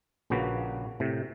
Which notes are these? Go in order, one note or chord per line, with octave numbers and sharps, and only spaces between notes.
A#1 C#3 A#3 F#4 B4
A2 C3